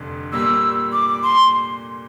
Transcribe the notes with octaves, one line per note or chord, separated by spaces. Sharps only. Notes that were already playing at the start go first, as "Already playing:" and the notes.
Already playing: F1 F2 D3
A#2 G3 A#3 E6
D6
C6